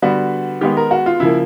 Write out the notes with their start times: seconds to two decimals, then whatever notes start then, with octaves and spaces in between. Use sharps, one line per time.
0.02 D3 G3 B3 F#4
0.61 D#3 G#3 B3 G4
0.77 A#4
0.91 F#4
1.06 F4
1.20 C#3 F3 A#3 E4